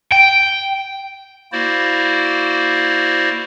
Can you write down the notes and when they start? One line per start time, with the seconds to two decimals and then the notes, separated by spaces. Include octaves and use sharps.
0.12 G5
1.52 A#3 E4 F#4 C5 D5